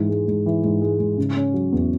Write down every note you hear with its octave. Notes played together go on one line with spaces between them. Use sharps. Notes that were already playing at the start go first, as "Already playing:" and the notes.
Already playing: G#2 E3
G#3
G#2
E3
G#2
G#3
G#2
C#3
C#4
F#3
E2